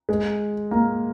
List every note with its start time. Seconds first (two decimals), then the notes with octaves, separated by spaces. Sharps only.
0.09 G#3
0.71 A#3